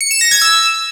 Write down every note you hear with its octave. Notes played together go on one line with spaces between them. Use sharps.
C#7
E7
A#6
G#6
E6